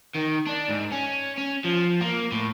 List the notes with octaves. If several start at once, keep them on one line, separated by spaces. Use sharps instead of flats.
D#3
D4
G#2
C#4
C#4
F3
A#3
A2